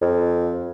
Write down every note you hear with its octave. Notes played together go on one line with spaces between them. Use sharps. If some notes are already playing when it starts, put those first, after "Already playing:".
F2